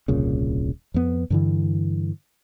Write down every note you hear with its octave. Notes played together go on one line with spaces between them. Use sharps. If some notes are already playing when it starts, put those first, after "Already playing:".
D#1 C2 A#2 C#3
F2 B3
G2 D3 E3